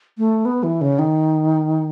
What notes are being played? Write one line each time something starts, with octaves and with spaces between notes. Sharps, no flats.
A3
B3
E3
C#3
D#3